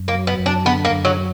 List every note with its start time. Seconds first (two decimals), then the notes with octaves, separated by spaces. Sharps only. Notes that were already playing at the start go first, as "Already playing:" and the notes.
Already playing: F#2
0.08 A#3
0.14 F#3
0.27 B3
0.39 F#2
0.46 D4
0.65 D3 B3
0.85 A#3
0.92 F#2
1.05 F#3
1.17 F#3